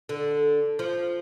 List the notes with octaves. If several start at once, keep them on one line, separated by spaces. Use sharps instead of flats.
D3
F3